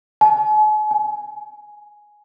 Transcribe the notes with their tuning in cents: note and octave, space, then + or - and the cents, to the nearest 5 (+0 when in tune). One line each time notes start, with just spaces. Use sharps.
G#5 +45
G#5 +5